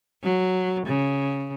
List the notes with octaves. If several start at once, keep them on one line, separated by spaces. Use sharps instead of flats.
F#3
C#3